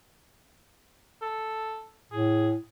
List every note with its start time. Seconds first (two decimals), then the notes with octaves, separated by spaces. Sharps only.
1.22 A4
2.12 A2 G#4